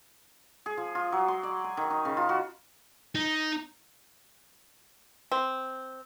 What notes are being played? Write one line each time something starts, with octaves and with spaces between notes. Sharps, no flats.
G#4
F3
F4
F#3
C6
D5
G#5
D#3
D#4
C#3
F4
F#4
D#4
C4